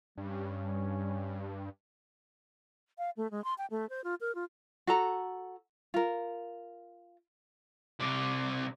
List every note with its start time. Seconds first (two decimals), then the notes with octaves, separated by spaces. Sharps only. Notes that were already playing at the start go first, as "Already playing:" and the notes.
0.17 G2 G3 C#4
2.98 F5
3.17 A3
3.31 G#3
3.44 C6
3.58 G5
3.71 A3
3.90 C5
4.04 F4
4.21 A#4
4.35 F4
4.87 F#4 A4 A#5
5.94 F4 A#4
8.00 C3 D5